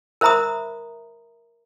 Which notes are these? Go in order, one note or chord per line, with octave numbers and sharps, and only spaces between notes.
A#4 C5 E5 A#5 B5 D#6